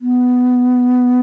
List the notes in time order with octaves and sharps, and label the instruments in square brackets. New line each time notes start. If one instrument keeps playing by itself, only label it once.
[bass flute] B3